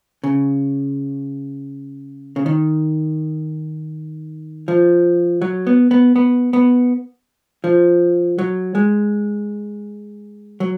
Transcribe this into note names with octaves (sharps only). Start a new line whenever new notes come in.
C#3
C#3
D#3
F3
F#3
B3
B3
B3
B3
F3
F#3
G#3
F#3